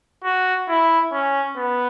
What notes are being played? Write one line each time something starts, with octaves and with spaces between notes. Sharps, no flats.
F#4
E4
C#4
B3